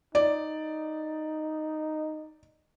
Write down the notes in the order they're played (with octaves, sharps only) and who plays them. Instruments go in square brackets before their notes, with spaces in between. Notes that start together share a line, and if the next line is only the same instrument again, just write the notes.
[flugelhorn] D#4 [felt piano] D5